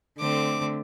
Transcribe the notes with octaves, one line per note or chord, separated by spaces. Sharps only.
D3 A3 C4 D6